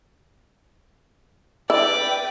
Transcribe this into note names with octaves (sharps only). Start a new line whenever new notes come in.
E4 B4 D5 G5